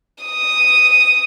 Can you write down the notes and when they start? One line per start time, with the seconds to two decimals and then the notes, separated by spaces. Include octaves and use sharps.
0.24 D#6